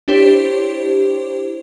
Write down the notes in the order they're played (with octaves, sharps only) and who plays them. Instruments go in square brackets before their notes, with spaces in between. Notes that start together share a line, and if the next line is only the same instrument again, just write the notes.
[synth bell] D4 E4 G4 C5 C#5